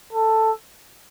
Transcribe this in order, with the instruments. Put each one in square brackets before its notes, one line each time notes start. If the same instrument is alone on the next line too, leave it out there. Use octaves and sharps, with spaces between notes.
[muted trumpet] A4